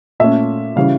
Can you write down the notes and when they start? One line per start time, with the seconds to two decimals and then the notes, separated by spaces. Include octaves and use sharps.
0.20 A#2 A3 C#4 E5
0.76 C#3 E3 G3 C#4 F5